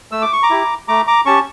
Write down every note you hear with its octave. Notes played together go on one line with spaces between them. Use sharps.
A3 E6
D6
C#6
A#5 D6
E4 G4
A3 A#5 D6
A#5 D6
C#4 G4 A5 C#6